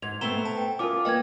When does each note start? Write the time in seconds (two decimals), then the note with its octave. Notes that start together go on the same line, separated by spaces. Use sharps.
0.02 G#2 G#6 F7
0.21 A3 B3 C4 A#5 E7 G7
0.45 A5
0.58 G5
0.79 C#4 F4 A#4 G#5 D6
1.05 A#3 B4 D#5 G5 G#6